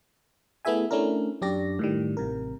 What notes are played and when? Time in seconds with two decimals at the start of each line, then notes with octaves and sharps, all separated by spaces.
0.65 A3 B3 E4 G#4 E5 G#5
0.91 A3 C#4 D4 E4 A#4
1.42 F#2 D4 G4 D5 A#6
1.79 A2 D#3 G3
2.17 A1 C3 A#4